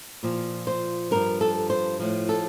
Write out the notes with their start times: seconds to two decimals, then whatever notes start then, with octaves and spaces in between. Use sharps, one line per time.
0.23 A#2 F3
0.67 C5
1.11 G2 F3 A#4
1.41 A4
1.70 C5
1.99 A2 F3
2.29 A4